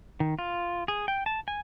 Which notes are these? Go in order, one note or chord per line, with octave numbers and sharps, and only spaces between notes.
D#3
F4
G#4
G5
A5
G#5